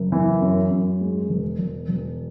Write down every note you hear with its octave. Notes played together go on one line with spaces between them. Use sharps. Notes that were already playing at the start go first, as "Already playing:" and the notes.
Already playing: F#1
E3
F#2
F#2
G#3
E1
E1
E1